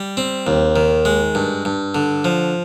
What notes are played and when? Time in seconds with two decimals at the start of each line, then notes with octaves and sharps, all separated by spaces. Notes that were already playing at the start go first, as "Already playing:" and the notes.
Already playing: G3
0.17 C4
0.47 D#2
0.76 D#3
1.05 G#3
1.35 G2
1.65 G2
1.95 D3
2.25 F3